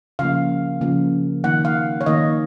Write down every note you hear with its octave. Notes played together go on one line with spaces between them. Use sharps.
C#3 F3 A#3 F5
C#3 F3 A#3
D#3 A#3 F#5
F5
C#5
D#3 A#3 D#5